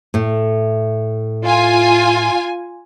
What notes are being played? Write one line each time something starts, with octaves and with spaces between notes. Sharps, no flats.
A2 A3
F4 G#5